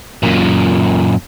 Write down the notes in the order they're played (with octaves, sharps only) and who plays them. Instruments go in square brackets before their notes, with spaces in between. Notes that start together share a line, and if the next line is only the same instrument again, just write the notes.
[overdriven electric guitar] F#2 A#2